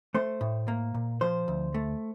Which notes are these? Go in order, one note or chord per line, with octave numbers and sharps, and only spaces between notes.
A3 C5
A2
A#3
A#2
F3 C5
D2
A3